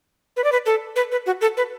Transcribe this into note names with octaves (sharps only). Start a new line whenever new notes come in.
B4
D5
B4
A4
B4
B4
F#4
A4
B4